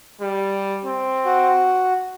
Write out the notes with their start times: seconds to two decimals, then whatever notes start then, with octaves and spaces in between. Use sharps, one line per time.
0.21 G3
0.85 C4
1.25 F#4